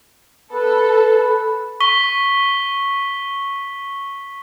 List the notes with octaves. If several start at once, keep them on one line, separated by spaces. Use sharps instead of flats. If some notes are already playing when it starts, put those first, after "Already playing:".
A4 B4
C#6 B6 G7